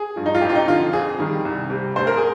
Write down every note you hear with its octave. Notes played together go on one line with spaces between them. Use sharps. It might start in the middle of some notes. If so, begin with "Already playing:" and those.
Already playing: G#4
G2 F3
D#4
F4
F2 G4
F4
D#4
D3 F3 F4
F2 G#4
D#3 G3
C2
C3 G3
D2 C5
A#4
G#4